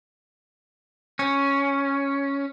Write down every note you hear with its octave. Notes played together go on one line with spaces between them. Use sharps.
C#4